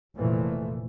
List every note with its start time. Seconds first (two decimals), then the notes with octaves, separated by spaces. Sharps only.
0.16 F1 A#2 E3 F3 A3